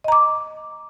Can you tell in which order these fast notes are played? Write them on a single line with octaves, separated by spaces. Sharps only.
D#5 A#5 D6